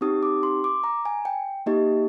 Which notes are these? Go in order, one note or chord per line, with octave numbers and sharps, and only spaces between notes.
C4 D#4 G4 D#6
D6
C6
D6
A#5
G#5
G5
A#3 D#4 G4 D#5